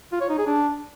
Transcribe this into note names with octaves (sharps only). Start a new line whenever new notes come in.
F4
C#5
D#4
G#4
D4